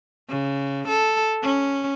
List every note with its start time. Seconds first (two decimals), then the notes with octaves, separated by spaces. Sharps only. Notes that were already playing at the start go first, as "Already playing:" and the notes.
0.29 C#3
0.88 A4
1.42 C#4